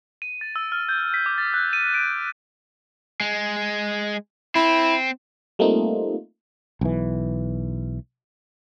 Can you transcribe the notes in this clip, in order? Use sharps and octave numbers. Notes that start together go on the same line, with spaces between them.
D#7
A6
E6
F6
G6
B6
D6
A6
F#6
D#7
D7
G#3
C4 E4
G3 A3 A#3 C4 D#4 F4
B1 E3